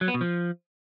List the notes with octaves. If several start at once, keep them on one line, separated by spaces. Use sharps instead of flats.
F#3
B3
B2
F3